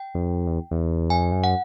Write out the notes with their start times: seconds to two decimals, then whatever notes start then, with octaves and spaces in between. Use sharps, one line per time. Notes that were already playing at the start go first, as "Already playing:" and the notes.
Already playing: G5
0.14 F2
0.47 E2
0.71 E2
1.10 F2 G#5
1.32 F#2
1.44 F#5